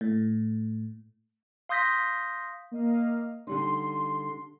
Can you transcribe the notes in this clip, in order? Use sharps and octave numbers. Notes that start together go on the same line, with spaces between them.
A2
F5 C6 D#6 G6 A#6 B6
A#3 D#5 F5
D3 G3 D#4 C6